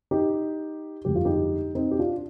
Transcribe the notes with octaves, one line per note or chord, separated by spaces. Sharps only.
D#4 G4
G1 F2 D3 G#3 G4
F4
D#4 G4
C4 D#4
G4
D4 F4